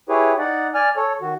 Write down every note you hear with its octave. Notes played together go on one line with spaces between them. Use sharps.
E4 G4 G#4 B4 C#5
D#4 D5 F#5
D5 G#5 F6
A4 C#5
D#3 F#4